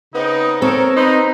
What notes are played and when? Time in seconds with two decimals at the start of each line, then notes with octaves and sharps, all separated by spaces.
0.14 C#3 B3 C4 D#4
0.62 C4 A4 A#4 C#5
0.96 D#4 B4 C5 A#5